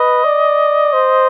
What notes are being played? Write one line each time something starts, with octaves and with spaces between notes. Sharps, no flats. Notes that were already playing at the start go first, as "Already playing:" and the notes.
Already playing: B4 D#5
D5
C5